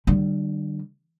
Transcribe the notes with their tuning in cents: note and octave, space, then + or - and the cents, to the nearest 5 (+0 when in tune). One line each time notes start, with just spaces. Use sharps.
D3 +35 G3 -20